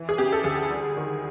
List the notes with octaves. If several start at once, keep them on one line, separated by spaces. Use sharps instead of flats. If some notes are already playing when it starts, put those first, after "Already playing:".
Already playing: E3
G#4
C#3 G4
A4
D2 G#4
G3
D#3